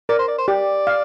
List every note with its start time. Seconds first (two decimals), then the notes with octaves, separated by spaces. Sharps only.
0.09 A#4 D5
0.19 C5
0.28 D5
0.38 C5
0.48 G4 D5
0.87 F5